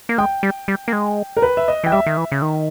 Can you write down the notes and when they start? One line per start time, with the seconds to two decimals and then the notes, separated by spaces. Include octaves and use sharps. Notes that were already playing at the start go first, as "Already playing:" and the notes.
0.09 A#3
0.18 G#3 G5
0.43 G3
0.68 G3
0.88 A#3
0.93 G#3
1.37 A#4
1.42 B4
1.57 E5
1.68 D#5
1.84 E3 G5
1.92 G3 E5
2.07 D#3
2.17 E3
2.32 C#3
2.42 D#3